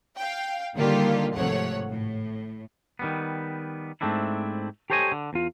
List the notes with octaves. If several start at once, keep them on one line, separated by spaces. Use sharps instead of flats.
F5 G5
D3 D#3 G3 A#3 F4 G4
G#1 C3 F3 A3 C#5 F#5
A2
D#3 G3 B3
G#2 A3 C4 D4 E4
G4 A4 C5 C#5 D#5 G#5
D3
E2 F4